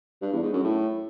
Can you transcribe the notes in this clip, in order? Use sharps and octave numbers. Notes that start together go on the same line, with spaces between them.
G2
E2
G#2
F#2
A2